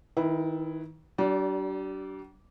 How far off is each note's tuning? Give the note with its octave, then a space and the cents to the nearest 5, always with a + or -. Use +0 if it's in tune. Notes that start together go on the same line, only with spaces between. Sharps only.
D#3 +25 E4 +0 B4 +5
G3 -45 D4 -15